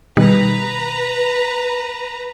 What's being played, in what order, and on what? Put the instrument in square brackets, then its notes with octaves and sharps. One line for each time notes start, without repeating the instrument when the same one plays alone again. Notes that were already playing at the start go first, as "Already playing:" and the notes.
[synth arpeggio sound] B2 D#3 G3 [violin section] B4 A#5